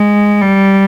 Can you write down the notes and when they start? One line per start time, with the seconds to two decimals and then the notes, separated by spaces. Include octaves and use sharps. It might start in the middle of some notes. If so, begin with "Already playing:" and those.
Already playing: G#3
0.42 G3